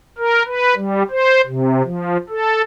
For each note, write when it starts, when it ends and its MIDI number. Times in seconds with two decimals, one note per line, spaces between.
0.18 0.43 70
0.47 0.75 71
0.75 1.03 55
1.11 1.41 72
1.46 1.82 48
1.84 2.17 53
2.29 2.62 69